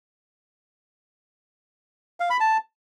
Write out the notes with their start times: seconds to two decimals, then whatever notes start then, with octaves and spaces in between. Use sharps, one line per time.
2.20 F5
2.30 B5
2.40 A5